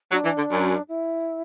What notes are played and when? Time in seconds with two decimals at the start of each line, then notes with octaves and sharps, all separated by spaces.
0.12 F#3 D4
0.24 E3
0.37 D3
0.50 F#2
0.88 E4